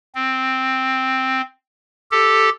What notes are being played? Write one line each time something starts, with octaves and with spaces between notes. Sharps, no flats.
C4
G4 A4